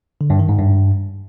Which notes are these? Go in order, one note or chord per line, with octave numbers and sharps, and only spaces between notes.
D3
G2
D#3
G#2
G2